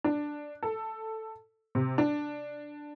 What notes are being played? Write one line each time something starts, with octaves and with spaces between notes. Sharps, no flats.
D4
A4
C3
D4